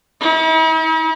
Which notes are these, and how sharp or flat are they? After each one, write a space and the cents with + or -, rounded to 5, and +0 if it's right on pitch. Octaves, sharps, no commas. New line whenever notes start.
E4 -45